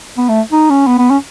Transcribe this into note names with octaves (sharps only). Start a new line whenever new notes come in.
B3
A3
D#4
C#4
B3
B3
C#4